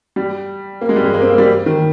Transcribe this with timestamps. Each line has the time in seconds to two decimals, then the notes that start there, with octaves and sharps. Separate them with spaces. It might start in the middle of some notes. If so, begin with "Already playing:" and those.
0.16 G3
0.81 A#3
0.89 G#3
0.96 G3
1.04 G#3
1.13 A#3
1.22 C4
1.30 A#3
1.38 G3
1.66 D#3